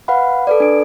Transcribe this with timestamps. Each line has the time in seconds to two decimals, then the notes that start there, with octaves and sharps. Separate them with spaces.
0.08 B4 F5 F#5 B5
0.47 A4 B4 D5
0.60 D4 D7